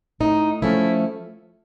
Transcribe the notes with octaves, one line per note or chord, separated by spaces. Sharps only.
A2 D#4
F3 A3 C#4 E4